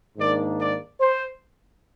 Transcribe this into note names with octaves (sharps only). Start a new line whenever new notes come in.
G#2 D#3 A#3 D4 D5
D5
C5